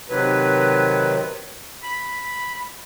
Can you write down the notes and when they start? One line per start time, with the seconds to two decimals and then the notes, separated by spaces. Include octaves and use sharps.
0.09 C3 D#3 F#3 B4
1.83 B5